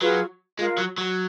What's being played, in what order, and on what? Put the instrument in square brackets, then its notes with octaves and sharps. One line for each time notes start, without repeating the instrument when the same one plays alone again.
[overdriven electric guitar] F#3 [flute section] F4 G#4 B4
[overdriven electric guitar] G#3 [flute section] F4 A#4 F5
[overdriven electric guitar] F#3
F#3